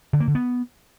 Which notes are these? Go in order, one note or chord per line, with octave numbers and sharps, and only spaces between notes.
D3
A#3
D3
B3